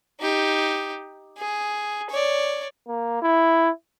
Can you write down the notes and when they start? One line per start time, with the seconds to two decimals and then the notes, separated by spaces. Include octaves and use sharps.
0.21 D#4 G4
1.38 G#4
2.10 C#5 D5
2.88 A#3
3.23 E4